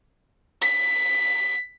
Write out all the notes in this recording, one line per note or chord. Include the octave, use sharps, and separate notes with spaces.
B6